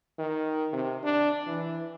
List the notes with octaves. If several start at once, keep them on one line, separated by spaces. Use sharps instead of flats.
D#3
C3
D4
E3